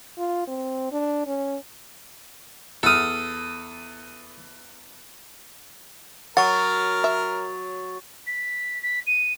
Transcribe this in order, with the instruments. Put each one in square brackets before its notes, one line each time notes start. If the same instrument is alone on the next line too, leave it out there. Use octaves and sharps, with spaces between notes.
[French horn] F4
C4
D4
C#4
[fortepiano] E2 F6 [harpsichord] A4 D#6
[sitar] F#3 [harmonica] A#4 [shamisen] F#5 [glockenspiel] C#6 A6
[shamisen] E5
[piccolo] B6
B6
D#7